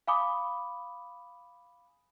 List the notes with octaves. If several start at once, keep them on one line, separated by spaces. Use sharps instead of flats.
F5 G#5 B5 D6 D#6